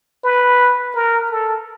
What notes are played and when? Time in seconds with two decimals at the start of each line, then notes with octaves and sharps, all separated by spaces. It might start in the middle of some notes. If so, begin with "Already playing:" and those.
0.24 B4
0.95 A#4
1.31 A4